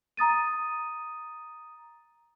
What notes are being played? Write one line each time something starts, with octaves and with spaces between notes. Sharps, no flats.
A#5 D#6 A6 D#7